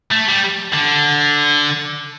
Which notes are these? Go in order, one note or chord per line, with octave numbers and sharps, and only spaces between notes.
A3
G3
D3